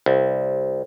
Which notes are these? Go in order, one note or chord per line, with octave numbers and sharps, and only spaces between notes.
C2